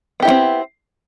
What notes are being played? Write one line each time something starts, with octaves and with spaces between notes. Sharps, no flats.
A3 B3 C4 E4 G4